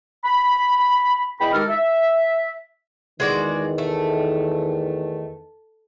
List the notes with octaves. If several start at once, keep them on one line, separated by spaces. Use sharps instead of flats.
B5
E2 D#5 G5 B5
D#3 G#3 G4 A4 A#4 F6
E5
E2 D#3 G#3 F#4 D5
A3